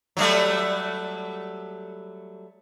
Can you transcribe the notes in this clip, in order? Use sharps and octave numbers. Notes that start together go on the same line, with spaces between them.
F#3 G3 A3